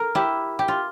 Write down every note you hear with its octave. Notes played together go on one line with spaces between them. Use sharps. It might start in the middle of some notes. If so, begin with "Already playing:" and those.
Already playing: A#4
E4 G4
G4
F4